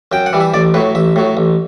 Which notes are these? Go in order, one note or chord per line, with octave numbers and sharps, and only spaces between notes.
F#2 G5
F#5
E3 G3
E5
A1 D5
A2 F#3 B4
A1 E5
A2 F#3
A1